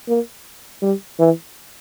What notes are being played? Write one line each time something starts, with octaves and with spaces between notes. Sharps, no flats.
A#3
G3
E3